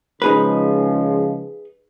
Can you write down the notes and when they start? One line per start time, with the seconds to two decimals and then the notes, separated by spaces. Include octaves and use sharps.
0.22 C#3 F3 G#3 D#4 G#4 B4